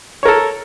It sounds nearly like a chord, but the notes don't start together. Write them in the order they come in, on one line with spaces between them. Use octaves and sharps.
C#5 A#4 A4